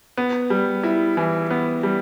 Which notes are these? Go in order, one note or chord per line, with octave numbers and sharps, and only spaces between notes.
B3
G3
E4
E3
B3
G3